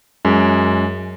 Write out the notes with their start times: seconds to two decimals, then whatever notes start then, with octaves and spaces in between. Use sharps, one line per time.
0.25 F#2 G#3